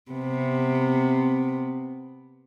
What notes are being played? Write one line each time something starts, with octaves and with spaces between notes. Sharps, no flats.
C3 B3